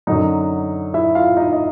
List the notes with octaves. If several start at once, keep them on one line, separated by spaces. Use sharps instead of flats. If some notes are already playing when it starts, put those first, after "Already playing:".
F#2 D3 F#3 D#4 D#5
E4 E5
F4 F5
D#4 D#5
D#5